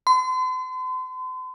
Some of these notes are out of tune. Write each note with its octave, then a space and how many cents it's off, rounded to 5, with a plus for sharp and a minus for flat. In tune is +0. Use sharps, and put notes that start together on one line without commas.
C6 -40